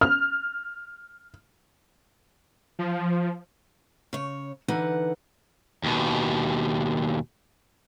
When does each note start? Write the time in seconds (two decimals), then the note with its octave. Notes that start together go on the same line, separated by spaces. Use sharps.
0.01 F6
2.79 F3
4.13 C#3 C#5
4.68 D3 E3 D#4 B4 F#5
5.84 D#2 B2